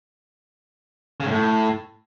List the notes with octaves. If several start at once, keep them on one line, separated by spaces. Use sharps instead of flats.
C#3
G#2
A2